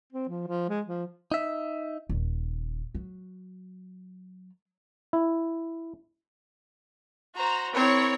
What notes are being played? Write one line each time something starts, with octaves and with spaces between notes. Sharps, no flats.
C4
F3
F3
G#3
F3
D#4 E5
D#1
F#3
E4
F#4 C5 A#5
C4 E4 A#4 C#5